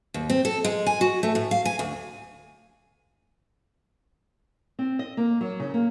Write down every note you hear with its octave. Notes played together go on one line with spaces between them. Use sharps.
D#2
C4
A4
G#3
G#5
F#4
A3
A2
F5
G#5
D2
C4
D#5
A#3
F#3
C#3
A#3